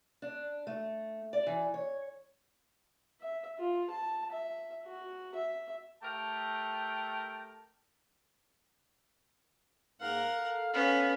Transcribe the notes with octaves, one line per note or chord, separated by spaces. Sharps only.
D4
A3
D5
E3
C#5
E5
F4
A5
E5
F#4
E5
A3 G4 A#4 G5 A5
G#2 A#3 A#4 F5 F#5
A4
B3 C#4 F5